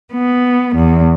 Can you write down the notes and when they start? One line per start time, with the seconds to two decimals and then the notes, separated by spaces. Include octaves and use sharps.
0.13 B3
0.75 E2